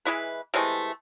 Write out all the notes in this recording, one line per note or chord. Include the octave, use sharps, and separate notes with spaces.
E3 G#3 E4 B4
C3 E3 G#3 A3